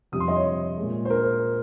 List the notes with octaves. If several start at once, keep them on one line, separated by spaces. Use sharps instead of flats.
F2 C3 G3 D#6
C6
D#5
C#5
A#2 G#3
C5
A#4